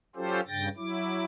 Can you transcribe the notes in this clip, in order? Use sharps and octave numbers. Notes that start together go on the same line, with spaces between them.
F#3 C#4 F4 G4 A4 C5
G2 C#3 G5 A6 A#6
F#3 E4 D6